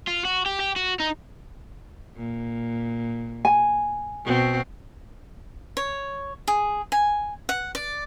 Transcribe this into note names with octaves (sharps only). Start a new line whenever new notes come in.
F4
F#4
G4
G4
F#4
D#4
A#2
G#5
B2 C4 F#4
C#5
G#4
G#5
F#5
D5